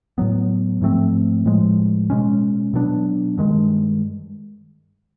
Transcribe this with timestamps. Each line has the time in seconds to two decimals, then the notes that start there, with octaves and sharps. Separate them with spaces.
0.18 A2 F#3 B3
0.81 G#2 F3 A3 C4
1.46 A2 F3 G#3
2.10 B2 G#3 C#4
2.74 B2 F#3 B3 D4
3.38 G2 D#3 G#3